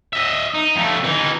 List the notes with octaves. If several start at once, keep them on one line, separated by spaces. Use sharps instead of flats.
D#5 E5
D#4
F2 A3
E3 D#4